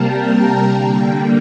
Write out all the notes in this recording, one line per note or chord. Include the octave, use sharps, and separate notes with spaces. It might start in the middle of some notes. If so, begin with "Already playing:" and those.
Already playing: C3 G3 A#3 A#4 G5 A5
A#5
D3 G3 A#3 G5
G5